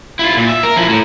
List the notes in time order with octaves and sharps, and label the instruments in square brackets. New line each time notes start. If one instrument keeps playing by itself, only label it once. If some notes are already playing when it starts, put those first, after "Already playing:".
[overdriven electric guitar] E4 F4
A#2
E5
A#4
F3 E4
A2